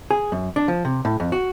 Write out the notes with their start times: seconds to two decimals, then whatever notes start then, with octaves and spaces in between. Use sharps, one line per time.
0.11 G#4
0.32 F#2
0.56 D4
0.68 F3
0.85 C3
1.05 A2
1.20 F2
1.32 F#4